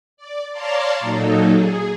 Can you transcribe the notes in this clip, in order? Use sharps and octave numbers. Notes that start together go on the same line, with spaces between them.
D5
C#5 D5 F5 A5 A#5 C6
A#2 F#3 A#3 D#4 A4
G#4